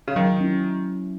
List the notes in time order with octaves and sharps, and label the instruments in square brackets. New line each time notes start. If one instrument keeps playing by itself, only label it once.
[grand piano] C#3
[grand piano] D#3 [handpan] F#3
[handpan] C#4 E4